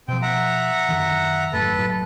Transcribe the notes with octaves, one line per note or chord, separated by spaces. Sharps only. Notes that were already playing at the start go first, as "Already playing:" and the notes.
B2 F3 C4 G5
E5 F#5 A#5
F#2 D3 D#3
G#1 F#2 A2 A4 B4
F#1 A2 F#3